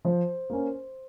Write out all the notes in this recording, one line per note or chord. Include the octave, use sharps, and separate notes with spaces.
F3 C5
A#3 C#4